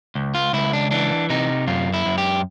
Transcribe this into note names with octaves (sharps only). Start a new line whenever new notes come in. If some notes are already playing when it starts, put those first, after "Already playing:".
C#2
F4
C#2 E4
D4
E3 D4
C3 D#4
F#2 F4
E4
F#2
G4